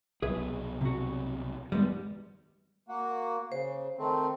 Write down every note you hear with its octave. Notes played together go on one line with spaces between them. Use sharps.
C2 B2 F#3 G#4 B4 E5
C3 F#4
G2 D#3 G3 G#3 B3
A#3 F#4
C#3 C5
D#3 A3 C4